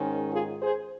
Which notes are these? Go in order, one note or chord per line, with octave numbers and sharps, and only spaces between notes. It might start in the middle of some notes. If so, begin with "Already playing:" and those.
Already playing: G#2 D#3 G#3 C#4
F4 G#4
G#4 C5